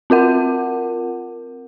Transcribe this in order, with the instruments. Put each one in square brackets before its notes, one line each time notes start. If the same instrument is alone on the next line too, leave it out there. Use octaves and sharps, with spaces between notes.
[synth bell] C4 F4 A#4 F#5